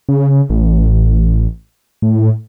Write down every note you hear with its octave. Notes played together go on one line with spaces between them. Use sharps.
C#3
A1
A2